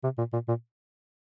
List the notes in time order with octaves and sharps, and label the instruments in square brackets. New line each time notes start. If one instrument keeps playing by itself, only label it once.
[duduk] C3
A#2
A#2
A#2